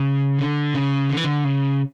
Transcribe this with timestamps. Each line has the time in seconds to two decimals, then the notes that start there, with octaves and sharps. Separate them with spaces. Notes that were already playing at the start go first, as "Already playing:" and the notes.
Already playing: C#3
0.39 D3
0.74 C#3
1.09 D3
1.17 E3
1.24 D3
1.44 C#3